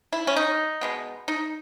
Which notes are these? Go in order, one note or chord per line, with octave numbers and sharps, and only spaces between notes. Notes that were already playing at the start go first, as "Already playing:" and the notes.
E4
C#4
D#4
B2 G#3 B3
D#4